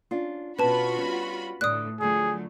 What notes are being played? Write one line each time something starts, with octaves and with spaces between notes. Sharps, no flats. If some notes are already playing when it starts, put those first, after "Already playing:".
C#4 D4 F4
B2 C#4 F4 F#4 B4 A5 B5
G3 C#4
A2 D3 D5 D#6 F#6
D3 F3 F#3 A3 G#4